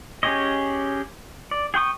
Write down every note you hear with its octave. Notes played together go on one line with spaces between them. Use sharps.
C#4 G4 G#4 C#5 D#5
D5
G#4 G5 C#6 D#6